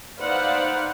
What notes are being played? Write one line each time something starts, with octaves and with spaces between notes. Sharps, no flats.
D#4 B4 C5 D5 F5 F#5